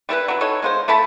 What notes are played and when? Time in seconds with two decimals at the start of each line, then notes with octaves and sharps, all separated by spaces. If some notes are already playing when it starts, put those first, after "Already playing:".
0.09 G3 E4 A4 B4
0.28 F#3 E4
0.41 D#4 A4 C#5
0.62 G#3 F4 C5
0.88 A3 E4 A5 B5